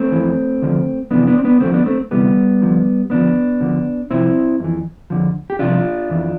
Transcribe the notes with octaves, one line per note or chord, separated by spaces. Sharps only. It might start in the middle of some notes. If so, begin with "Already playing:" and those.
Already playing: A3 C4
F2 E3
D2 D3 F3
F2 C3 E3 B3 D4
B3 D4
C4
B3 D4
D2 D3 F3 A3 C4
B3 D4
A3 C4
D2 C3 E3 G3 B3
D2 D3 F3
F2 D3 F3 B3 D4
D2 D3 F3
C2 C3 F3 C4 E4
F2 E3
F2 D3 F3
G4
C2 C3 F3 D4 F4
F2 E3